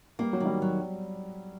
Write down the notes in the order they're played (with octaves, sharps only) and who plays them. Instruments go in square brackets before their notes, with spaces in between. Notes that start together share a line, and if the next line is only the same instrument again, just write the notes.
[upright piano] G3 [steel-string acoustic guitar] A#3
[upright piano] F#3
[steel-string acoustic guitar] D#3
[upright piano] G3
[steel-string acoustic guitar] F#3